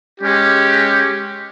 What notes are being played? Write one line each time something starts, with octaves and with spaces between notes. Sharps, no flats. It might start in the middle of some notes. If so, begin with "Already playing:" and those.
G#3 C#4 G4